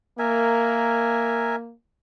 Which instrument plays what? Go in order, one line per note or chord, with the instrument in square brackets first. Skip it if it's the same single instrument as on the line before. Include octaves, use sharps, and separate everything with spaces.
[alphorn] A#3 [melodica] A#4 E5 G#5